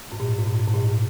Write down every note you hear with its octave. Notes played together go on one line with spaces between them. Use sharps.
G#2
A#2
G#2
A#2
G#2
A#2